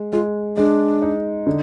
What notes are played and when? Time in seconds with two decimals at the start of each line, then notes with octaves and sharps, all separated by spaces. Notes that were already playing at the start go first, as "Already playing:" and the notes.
Already playing: G#3
0.13 G#3 F4
0.57 G#3 D4
1.02 D#4
1.47 D3